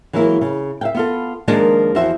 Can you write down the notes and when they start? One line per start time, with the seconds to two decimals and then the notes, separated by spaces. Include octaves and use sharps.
0.13 E3 F#3 G#3 A#3 E4
0.41 C#3
0.81 E5 F5 G5
0.95 B3 F4 A4
1.48 D#3 F3 G#3 A#3 D4
1.95 E2 F3 F#4 C5 E5